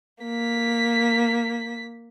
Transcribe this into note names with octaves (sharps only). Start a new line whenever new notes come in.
A#3 B6